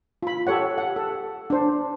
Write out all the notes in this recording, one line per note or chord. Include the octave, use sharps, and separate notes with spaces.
F4 B5
G4 A4 C#5 F#5
F#5
A4
D4 C5